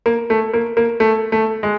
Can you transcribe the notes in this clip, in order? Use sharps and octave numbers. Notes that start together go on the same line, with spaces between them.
A#3
A3
A#3
A#3
A3
A3
G#3